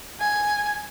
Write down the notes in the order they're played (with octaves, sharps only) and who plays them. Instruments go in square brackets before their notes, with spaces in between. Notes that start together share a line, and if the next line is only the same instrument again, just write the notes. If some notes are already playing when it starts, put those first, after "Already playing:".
[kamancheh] G#5